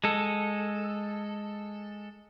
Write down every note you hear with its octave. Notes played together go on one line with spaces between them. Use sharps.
G#3 A4